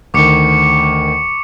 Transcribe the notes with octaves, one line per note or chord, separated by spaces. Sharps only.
D2 D#3 C#6 D6 C#7